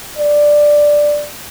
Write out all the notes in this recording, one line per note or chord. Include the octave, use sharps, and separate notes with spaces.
D5